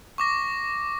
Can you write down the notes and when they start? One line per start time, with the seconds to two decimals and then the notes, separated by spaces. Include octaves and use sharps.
0.18 C#6 D6 A#6